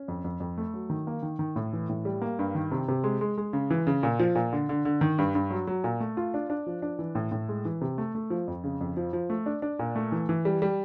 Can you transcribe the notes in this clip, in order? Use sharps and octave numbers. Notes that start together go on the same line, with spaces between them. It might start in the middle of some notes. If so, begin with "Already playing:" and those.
Already playing: C#4
F2
F2
F2
A3
F#3
D#3
A#3
D#3
D#3
A2
E3
A2
G3
A#3
G2
D#3
C3
C3
G#3
G#3
G#3
C#3
E3
C#3
A#2
F3
A#2
D3
D3
D3
D#3
G2
G2
F#3
F#3
A#2
A3
F4
D4
D4
F3
D4
E3
A2
A2
G#3
E3
C3
A3
A3
F3
F2
C#3
F2
F3
F3
A3
D4
D4
A#2
A3
E3
E3
G3
G3